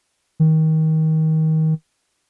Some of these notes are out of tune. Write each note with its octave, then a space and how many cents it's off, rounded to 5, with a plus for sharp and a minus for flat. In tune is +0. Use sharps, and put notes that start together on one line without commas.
D#3 +25